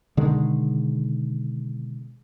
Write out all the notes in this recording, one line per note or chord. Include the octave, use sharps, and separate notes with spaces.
B2 D3 D#3 G#3